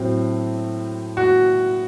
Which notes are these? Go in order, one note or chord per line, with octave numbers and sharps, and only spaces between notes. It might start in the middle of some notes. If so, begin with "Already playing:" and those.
Already playing: A2 F#3 C4
F#4